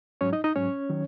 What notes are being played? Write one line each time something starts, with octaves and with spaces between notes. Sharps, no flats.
G#2 F#3 C#4 C#5
D#4 D#5
D#4 D#5
G#2 F#3 C#4 C#5
D#3 F#3